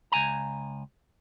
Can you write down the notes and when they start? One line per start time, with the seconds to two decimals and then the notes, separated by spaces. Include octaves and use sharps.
0.12 C#2 G#5 A#5